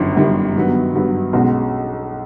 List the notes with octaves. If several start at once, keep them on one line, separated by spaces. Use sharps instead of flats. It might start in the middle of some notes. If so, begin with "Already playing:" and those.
Already playing: G1 F#2 D#3 G3
G1 F#2 D#3 G3
G2 D#3 F#3 B3
G2 D#3 F#3 B3
B1 B2 G#3 C#4 F#4